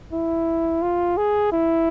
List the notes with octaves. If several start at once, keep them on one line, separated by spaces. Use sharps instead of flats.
E4
F4
G#4
E4